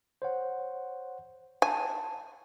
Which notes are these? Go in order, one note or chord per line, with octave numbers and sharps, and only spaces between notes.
C5 C#5 F#5
G#5 A5